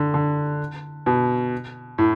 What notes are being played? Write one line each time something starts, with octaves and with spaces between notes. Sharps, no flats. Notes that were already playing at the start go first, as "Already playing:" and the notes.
Already playing: D3
D3
B2
A2